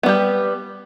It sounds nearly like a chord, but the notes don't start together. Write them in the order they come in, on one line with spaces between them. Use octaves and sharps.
B3 G3 G4